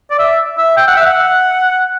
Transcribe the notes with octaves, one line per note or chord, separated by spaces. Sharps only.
D5
E5
E5
G5
F#5
E5
F#5